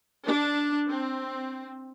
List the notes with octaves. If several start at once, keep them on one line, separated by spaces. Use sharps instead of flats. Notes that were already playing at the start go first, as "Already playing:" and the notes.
D4
C4